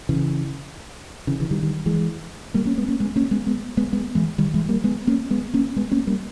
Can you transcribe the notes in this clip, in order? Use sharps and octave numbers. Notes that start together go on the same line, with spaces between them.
C#3 E3
C#3 E3
C#3 E3
D#3 G3
D#3 G3
E3 G#3
G3 A#3
A#3 C#4
G#3 B3
A#3 C#4
G#3 B3
A#3 C#4
G#3 B3
G#3 B3
G#3 B3
G#3 B3
E3 G#3
D#3 G3
E3 G#3
G3 A#3
G#3 B3
A#3 C#4
G#3 B3
A#3 C#4
G#3 B3
A#3 C#4
G3 A#3